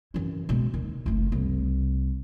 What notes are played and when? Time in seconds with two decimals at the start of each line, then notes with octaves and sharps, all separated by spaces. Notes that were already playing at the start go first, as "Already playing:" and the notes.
0.14 F#2 E3
0.49 B2 G#3
0.74 D#2
1.06 F#1 A3
1.32 C2